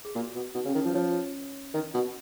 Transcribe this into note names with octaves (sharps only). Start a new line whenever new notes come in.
G#4
A#2 F#4
B2
B2 D#4
C#3
C#4
D#3
F3 D#4
B4
F3 C#5
D#3 D#5
B2